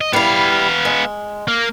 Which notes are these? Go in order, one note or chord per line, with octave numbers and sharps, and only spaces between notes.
D#5
G3 B3 E4 F5
G#3
A#3